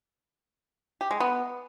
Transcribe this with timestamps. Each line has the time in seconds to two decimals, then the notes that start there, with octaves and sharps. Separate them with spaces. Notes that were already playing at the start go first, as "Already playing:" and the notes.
1.01 G4
1.11 G#3
1.20 B3